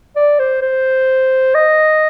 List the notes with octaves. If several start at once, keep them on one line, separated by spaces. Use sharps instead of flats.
D5
C5
C5
D#5